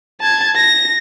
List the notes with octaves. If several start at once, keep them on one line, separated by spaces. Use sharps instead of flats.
A5 G#6
A#6